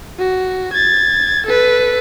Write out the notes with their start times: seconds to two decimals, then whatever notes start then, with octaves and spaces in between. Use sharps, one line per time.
0.19 F#4
0.73 G#6 A6
1.46 A4 B4